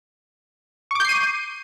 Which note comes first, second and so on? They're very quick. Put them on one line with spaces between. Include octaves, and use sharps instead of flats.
C#6 D6 G6 C7 D#7